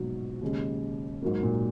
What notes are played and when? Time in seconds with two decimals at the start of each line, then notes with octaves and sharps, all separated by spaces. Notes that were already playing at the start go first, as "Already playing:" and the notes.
Already playing: A#1 G#2 B2 F#3
0.41 D#2 C#3 G#3
1.22 G#2 F#3 A#3
1.43 A#2